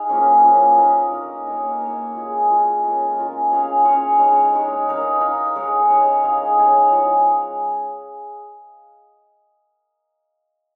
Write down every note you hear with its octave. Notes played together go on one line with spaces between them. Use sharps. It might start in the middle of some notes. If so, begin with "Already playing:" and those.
Already playing: D#4 G#4 F5
F3 A#3 C#4
F3 A#3 C#4
D#4 A#4 D#5
D#4 A#4 D#5
A#3 D#4 C#5 F5
A#3 D#4 C#5 F5
G#3 F4 G#4
G#3 F4 G#4
G#3 C#4 F4 A#4
G#3 C#4 F4 A#4
C#4 G#4 C#5 F5
C#4 G#4 C#5 F5
G#3 D#4 C#5
G#3 D#4 C#5
D#4 A#4 F5
D#4 A#4 F5
G#3 D#4 C#5
G#3 D#4 C#5
D#4 G#4 C#5 F5
D#4 G#4 C#5 F5
F3 G#3 D#4 C#5